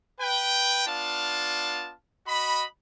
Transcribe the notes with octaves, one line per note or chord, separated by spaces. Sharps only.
B4 G5
B3 D4 F4 F5 A5
F#4 D#5 B5